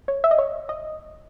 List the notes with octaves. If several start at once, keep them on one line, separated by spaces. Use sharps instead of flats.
C#5
E5
D#5
C#5
D#5